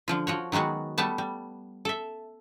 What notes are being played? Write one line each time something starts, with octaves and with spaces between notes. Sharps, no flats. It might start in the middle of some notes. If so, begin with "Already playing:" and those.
D3 F3 F4
F3 F#4 C#5
D#3 F#3 G#3 B3 F#4
G3 A3 B3 A5
G3
A4 E5